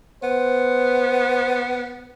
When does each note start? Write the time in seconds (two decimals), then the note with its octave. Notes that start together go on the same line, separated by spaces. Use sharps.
0.23 B3 C5